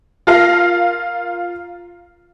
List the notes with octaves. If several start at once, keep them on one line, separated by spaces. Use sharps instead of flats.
F4 A#4 F5 A#6